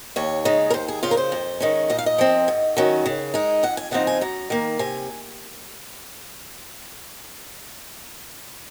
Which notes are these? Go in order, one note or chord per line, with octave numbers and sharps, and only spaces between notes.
D#2 C#5
C#3 G#3 D#4
A#4
D#2 C5
G#4
C#3 F3 F4
A#4
C5
F2
D#3 G#3 C#4
A#2 D#5
F5
D#5
F3 C4
G#2
D#3 F#3 C#4
C#3
G#3 D#4
F2 F#5
G#5
C#3 F3 C4 D#4 F#5
G#5
F#2 A#5
D#3 A#3
C3 G#5